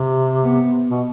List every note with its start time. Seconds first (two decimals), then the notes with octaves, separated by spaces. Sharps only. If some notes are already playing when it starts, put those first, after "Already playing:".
Already playing: C3
0.44 B3
0.91 B2